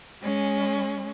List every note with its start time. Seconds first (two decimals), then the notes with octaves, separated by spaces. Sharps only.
0.23 G#3 C#4